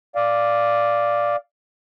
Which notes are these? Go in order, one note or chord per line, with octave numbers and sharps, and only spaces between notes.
D5 F5